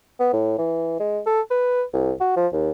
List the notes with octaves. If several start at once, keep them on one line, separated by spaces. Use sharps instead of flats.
B3
A2
E3
G#3
A4
B4
C2
F#4
F3
D#2